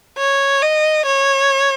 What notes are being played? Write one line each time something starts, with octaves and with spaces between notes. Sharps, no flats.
C#5
D#5
C#5